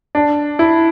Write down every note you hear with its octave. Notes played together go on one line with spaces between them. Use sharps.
D4
E4